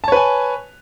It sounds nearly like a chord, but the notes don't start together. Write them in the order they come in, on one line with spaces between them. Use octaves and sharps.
A5 C#5 B4 G#5